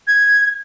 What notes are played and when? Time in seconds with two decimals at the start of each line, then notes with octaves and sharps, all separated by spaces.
0.08 G#6